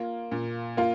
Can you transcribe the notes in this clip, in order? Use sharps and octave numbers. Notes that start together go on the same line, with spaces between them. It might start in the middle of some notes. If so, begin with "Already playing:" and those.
Already playing: A#3 F4
A#2
A#3 F4